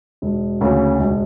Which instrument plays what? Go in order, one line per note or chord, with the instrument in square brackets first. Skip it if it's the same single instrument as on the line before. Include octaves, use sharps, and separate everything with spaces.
[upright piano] E1
D2 C#3
E1